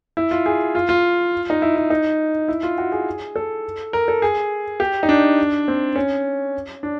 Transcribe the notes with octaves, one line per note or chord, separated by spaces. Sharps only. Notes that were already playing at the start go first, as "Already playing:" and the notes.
E4
F4
G#4
F4
F4
D#4
E4
E4
D#4
E4
F4
F#4
G#4
A4
A#4
A4
G#4
G4
D#4
D4
C4
C#4
D4